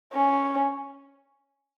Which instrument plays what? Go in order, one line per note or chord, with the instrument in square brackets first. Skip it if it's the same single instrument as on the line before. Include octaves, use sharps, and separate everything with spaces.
[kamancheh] C#4